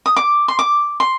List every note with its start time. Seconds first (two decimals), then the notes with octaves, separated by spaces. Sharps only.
0.06 D#6
0.16 D6
0.48 C6
0.59 D6
1.00 C6